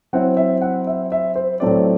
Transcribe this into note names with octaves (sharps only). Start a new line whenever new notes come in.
F#3 C4 E4 F#5
E5
F#5
E5
E5
C5
A2 F#3 A3 C4 D5